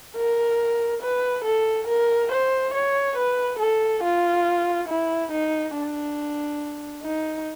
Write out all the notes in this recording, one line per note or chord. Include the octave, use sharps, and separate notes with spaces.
A#4
B4
A4
A#4
C5
C#5
B4
A4
F4
E4
D#4
D4
D#4